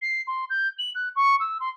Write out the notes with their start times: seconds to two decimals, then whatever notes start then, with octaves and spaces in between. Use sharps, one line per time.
0.01 C7
0.27 C6
0.49 G6
0.78 F#7
0.95 F#6
1.15 C#6
1.39 E6
1.60 C6